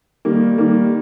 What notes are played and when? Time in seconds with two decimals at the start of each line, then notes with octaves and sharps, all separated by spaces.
0.25 D#3 G3 A#3
0.58 D#3 G3 A#3